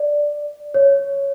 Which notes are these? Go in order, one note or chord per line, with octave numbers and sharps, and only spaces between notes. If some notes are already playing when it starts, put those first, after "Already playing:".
Already playing: D5
C#5